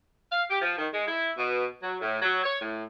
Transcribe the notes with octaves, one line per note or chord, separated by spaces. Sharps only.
F5
G4
F3
D#3
G#3
E4
B2
F#3
A2
F#3
C#5
A2